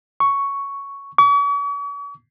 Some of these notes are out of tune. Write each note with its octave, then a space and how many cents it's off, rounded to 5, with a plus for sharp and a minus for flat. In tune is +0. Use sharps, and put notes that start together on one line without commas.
C#6 +5
C#6 +45